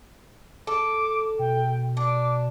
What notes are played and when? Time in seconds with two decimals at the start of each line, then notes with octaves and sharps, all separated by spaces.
0.67 A4 D6
1.39 B2 G5
1.97 D4 D6